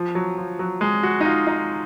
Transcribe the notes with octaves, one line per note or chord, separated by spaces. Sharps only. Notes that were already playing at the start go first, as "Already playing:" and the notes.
Already playing: F3
F#3
F3
F#3
G#3
F#4
D#4
F4
D#4